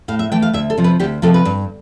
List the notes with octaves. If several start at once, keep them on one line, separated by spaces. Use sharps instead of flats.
A2 F5
E5
E3 A3 G5
F5
D2 E5
A4
C3 F3
B4
D2 G4
C3 F3 A4
B4
G2